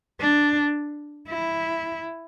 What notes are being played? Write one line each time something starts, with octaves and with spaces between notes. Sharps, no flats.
D4
E4